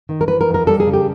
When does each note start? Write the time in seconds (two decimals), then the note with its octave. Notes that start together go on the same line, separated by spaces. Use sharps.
0.09 D#3
0.21 A#4
0.28 E3 B4
0.41 A#4
0.48 F2
0.54 A#4
0.67 G3 A4
0.80 G#4
0.87 C#3
0.93 G4